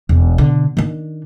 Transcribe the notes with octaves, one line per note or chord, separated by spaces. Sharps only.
E1
B2 D3
D#3 D4